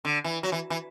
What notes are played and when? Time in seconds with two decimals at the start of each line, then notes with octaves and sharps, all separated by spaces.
0.05 D3
0.24 E3
0.43 F#3
0.52 E3
0.70 E3